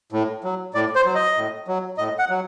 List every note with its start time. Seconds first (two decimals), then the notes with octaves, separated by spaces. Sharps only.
0.12 A2
0.44 F#3
0.74 A2 D5
0.95 C5
1.05 F#3
1.15 D#5
1.37 A2
1.68 F#3
1.98 A2 D#5
2.19 F#5
2.30 F#3